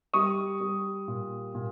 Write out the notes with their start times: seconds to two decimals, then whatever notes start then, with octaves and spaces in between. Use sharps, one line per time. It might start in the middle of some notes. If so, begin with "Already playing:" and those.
0.14 G3 C#6 D#6
0.61 G3
1.08 A#2
1.55 A#2